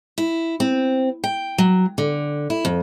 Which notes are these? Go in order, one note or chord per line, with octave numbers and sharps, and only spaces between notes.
E4
C4
G5
F#3
D3
E4
F2